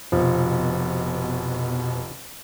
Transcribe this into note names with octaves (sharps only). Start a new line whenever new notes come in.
F1 B2 F3